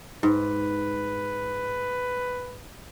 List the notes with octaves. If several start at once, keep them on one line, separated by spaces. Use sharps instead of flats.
G#2 B4